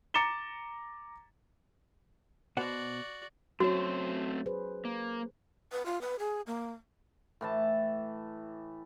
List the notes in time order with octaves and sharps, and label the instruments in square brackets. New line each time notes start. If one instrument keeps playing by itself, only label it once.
[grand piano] A#5 D6 A6 C#7 E7 G7
[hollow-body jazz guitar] B2 C5 F#5 [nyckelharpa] F#4 D5
[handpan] F#3 C#4 C#5 [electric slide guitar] A3 C4 C5 [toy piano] F#4
[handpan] G#4 B4 C5
[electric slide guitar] A#3
[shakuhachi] B4
F4
B4
G#4
A#3
[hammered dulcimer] A2 E3 A5